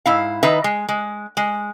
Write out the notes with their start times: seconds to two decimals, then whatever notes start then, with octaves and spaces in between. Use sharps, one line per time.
0.06 G#2 E4 F5
0.43 D#3 D#4 B4 E5
0.64 G#3
0.89 G#3
1.37 G#3